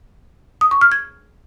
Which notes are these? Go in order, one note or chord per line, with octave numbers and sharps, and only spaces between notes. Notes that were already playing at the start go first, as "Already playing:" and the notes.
D#6
C#6
F6
G#6